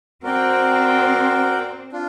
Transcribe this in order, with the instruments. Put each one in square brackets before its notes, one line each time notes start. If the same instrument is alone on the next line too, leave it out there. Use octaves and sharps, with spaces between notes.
[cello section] C4 [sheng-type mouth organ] F#4 A#4 D5 G5
[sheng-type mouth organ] D4 F4